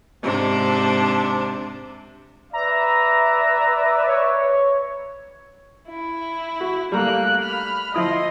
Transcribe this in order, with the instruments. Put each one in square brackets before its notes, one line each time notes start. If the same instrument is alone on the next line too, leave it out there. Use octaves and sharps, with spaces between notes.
[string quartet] G#2 C3 D4
[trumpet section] B4 D5 E5 [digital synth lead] A#5
[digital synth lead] C#5
[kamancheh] E4
[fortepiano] F#4
[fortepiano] G3 A3 A#5 [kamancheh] A#3 F#6
[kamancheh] B5 F6
[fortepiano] F3 E4 D#6 [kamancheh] D#5 C6